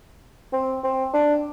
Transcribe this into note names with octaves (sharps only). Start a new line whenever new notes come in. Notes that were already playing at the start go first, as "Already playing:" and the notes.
C4
C4
D4